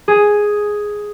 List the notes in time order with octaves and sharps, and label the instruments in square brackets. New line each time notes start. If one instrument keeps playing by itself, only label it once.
[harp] G#4